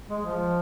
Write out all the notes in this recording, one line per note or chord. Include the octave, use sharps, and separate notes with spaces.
G#3
F3